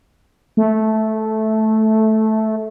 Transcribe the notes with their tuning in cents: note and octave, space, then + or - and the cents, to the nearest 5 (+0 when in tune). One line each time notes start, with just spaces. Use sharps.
A3 -10